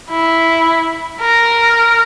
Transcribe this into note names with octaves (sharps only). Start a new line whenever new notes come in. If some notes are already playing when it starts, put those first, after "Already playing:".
E4
A#4